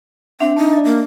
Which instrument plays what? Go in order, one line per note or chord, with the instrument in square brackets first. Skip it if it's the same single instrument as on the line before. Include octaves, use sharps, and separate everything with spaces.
[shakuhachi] C4 [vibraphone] D4 [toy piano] E5 F#5 C6
[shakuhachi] D#4 [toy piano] A5
[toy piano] D5 D#5
[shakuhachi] A#3